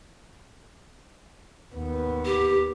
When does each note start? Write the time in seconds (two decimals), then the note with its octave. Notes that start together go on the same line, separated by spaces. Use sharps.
1.74 D#2 B3
2.25 G4